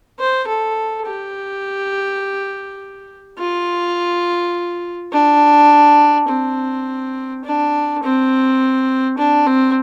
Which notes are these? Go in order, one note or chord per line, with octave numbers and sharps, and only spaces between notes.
C5
A4
G4
F4
D4
C4
D4
C4
D4
C4